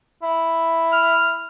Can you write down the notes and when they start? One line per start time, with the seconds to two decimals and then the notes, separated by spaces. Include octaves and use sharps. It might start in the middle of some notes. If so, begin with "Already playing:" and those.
0.23 E4
0.92 F6